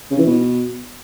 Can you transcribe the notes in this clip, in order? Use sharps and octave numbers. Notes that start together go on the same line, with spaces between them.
C#3
E3
B2